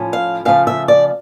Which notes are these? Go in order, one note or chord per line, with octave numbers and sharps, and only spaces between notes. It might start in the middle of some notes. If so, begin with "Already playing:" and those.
Already playing: A2 F3 C#4
F5
C#3 F3 A3 F5
E5
D5